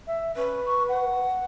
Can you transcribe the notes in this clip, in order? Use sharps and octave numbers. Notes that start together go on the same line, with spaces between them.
E5
C#4 B4
C#6
F#5